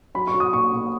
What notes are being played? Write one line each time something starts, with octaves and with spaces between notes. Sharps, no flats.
F#3 B5
C#6
F#3
D#6
A#2 C#6
A#2